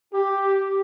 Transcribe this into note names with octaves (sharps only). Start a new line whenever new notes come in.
G4